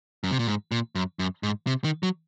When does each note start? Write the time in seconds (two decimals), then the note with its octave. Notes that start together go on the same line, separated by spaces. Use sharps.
0.24 F#2
0.31 C3
0.39 A#2
0.47 G#2
0.71 A#2
0.95 F#2
1.19 F#2
1.43 G#2
1.67 C3
1.84 D#3
2.03 F#3